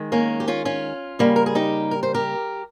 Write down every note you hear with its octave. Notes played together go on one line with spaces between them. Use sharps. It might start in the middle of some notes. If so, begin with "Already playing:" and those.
Already playing: D#3 G#3
A#3 C#4
G4
C#4 F4
C#4 F4
C#3 G3 A#3
A#4
G#4
D#4 G4
A#4
C5
G4 A#4